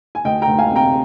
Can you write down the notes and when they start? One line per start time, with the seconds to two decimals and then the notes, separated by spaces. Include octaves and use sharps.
0.15 G#5
0.24 D2 D#5 G5
0.42 G5 A#5
0.47 D2
0.58 F5 G#5
0.71 C3 G5 A#5